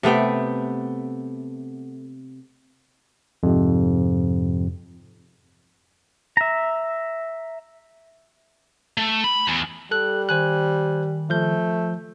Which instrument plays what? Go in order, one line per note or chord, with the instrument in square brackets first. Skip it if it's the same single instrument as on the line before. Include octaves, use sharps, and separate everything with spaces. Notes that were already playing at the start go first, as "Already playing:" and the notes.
[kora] C3 A3 B3 G5
[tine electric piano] F2 G#2 C3
[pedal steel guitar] E5 A#5
[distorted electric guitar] A3
B5
E2
[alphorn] G3 [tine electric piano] A4 F#6
[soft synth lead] D#3 [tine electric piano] C5 G#5 F#6
[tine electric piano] F3 G6 [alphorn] A3